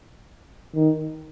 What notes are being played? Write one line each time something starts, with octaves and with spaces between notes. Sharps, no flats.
D#3